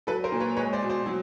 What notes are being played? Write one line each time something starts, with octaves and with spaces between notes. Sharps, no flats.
F#3 A4 B4
A#4 C5
A#2
B4 C#5
G#3 B4 C#5
C5 D5
B2
C5 D5
F#3